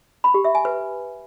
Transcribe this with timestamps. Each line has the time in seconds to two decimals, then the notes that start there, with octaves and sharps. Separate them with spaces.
0.24 B5
0.34 G4
0.45 E5
0.55 G#5
0.65 B4